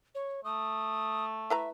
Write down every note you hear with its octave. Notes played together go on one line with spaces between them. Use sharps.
C#5
A3 D#6
E4 B4 E5 A#5